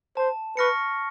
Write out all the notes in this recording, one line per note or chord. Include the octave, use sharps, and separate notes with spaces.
C5 A5
B4 C#6 F6 A#6 C#7